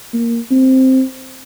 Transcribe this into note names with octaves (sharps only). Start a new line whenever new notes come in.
A#3
C4